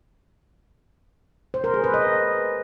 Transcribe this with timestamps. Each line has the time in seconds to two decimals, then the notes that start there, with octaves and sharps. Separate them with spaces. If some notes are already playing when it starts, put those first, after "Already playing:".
1.54 C5
1.64 A#4
1.74 G#4
1.84 B4
1.94 D#5